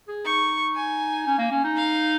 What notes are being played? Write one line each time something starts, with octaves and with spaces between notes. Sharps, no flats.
G#4
D#4 C#6
G#5
C#4
A#3
C#4
D#4
F5